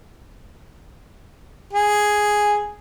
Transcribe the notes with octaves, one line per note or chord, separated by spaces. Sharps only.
G#4